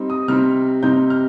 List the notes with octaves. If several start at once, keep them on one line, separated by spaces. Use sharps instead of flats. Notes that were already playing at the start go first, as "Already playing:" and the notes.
Already playing: G3 C4 D#4
D#6
C3 G3 C4 D#4 F6
C3 G3 C4 D#4 G6
F6